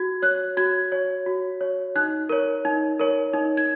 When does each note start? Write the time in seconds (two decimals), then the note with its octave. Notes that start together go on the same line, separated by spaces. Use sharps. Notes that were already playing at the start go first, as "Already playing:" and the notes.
Already playing: F#4 G#6
0.22 C#5 F#6
0.57 F#4 G#6
0.92 C#5
1.26 F#4
1.61 C#5
1.96 D#4 F#6
2.29 A#4 C#5
2.65 D#4
3.00 A#4 C#5
3.34 D#4
3.57 G#6